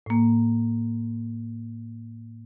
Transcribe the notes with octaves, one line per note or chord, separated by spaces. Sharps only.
A2 A#3